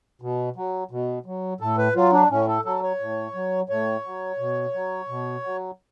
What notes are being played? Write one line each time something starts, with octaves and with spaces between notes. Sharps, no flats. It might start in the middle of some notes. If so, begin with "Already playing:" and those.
B2
F#3
B2
F#3
A2 A4
B4
F#3 F4
D4
A2 C#4
A4
F#3 A4
C#5
A2
F#3
A2 C#5
F#3
B2
F#3
B2
F#3